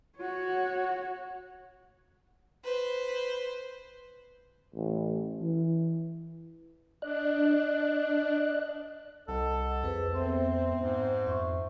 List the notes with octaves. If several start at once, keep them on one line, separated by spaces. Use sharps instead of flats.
F#4 C#5
B4 C5
A1
E3
D4 D5 D#5 F#6
C2 A4 D#5 F#5
F2 G#4 B4 C5
B3 C4 E5 C6
G#2
F2 E5 C6 C#6